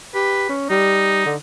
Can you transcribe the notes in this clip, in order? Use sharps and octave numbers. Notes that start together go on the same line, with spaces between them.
G4 B4
C#4
G3 D#4
D3